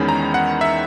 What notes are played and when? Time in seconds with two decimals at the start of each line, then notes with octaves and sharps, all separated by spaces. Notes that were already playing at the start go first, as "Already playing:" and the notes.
Already playing: E2 D#3 G#3 C#4 B5
0.08 A#5
0.34 F#5
0.61 E5